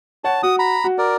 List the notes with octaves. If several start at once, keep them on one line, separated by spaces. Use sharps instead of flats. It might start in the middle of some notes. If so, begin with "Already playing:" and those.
C#5 F#5 A5
F#4 D#6
A#5 B5
F#4
A#4 D5